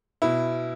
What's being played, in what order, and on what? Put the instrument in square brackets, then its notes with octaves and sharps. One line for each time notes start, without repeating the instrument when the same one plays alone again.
[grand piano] B2 E4